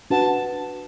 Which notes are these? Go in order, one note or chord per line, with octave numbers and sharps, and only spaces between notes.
D4 F#4 B4 F#5 A5